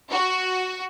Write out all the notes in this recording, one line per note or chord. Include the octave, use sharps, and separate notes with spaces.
F#4